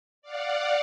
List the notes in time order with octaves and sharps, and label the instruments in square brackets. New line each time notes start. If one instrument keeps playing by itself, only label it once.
[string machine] D5 F5 F#5